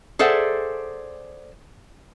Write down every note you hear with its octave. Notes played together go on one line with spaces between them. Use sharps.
G#4 A4 C5 D5 E5 F#5